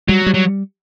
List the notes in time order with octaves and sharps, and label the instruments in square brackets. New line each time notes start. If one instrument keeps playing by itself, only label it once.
[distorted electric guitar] F#3 [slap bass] G3
[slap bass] G3
[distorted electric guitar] F#3